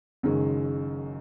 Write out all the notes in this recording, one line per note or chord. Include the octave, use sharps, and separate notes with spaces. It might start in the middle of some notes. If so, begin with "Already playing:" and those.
F#1 F#2 D#3 G#3